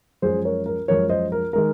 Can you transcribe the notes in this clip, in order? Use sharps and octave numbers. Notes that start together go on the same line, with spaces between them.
F#2 F3 G#3 C#4 G#4 C5
A#4 C#5
A#4
F#2 F3 G#3 C#4 A#4 C#5
C5 D#5
A#4
D#3 G#3 D#4 A#4